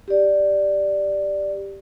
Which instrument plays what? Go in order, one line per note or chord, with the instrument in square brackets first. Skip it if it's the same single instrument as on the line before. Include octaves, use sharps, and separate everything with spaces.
[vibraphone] G4 D5